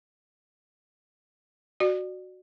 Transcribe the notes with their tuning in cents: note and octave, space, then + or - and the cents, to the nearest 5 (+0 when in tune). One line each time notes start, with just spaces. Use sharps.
F#4 +0 D5 +30